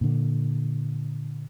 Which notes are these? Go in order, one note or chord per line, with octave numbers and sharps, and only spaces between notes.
A#2 D3